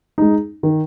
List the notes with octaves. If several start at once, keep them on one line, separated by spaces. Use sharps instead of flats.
G#3 D#4
D#3